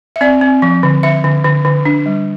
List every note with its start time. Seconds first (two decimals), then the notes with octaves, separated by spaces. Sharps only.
0.16 E5
0.21 C4 D5
0.41 C4
0.62 F3
0.83 D3
1.03 D3 E5
1.24 D3
1.44 D3
1.65 D3
1.85 D4
2.06 G3